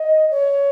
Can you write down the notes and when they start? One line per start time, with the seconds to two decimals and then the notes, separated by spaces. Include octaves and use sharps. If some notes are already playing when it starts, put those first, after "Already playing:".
Already playing: D#5
0.31 C#5